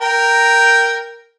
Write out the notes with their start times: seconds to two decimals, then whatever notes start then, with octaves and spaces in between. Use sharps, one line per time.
0.02 A#4 G5 A#5